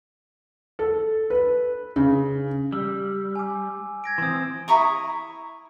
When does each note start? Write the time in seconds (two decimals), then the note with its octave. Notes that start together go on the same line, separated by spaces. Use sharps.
0.79 A4
1.30 B4
1.96 C#3
2.72 G3 E6
3.35 G#5 D6
4.04 G#6 A#6 D7
4.18 E3 C4 C6 D#6
4.68 E4 A#5 C#6 D#6